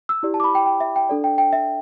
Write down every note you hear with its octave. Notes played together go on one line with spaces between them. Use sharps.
E6
E4 G4 D5
A5
D6
B5
G5
G5
E5
G5
D4 A4 D5
G5
G5
E5